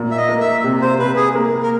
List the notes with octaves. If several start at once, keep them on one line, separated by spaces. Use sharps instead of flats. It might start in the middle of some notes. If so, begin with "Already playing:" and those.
Already playing: A#2
E5
D#5
A#3
E5
C3
C5
C3 B4
G#4
A#3
A#4